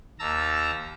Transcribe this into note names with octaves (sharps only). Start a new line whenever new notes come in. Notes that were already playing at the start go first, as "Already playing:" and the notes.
D#2 A5 A#5 E6